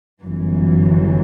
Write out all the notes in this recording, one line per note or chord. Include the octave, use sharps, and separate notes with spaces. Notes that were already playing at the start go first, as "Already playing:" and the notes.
G1 F#2 E3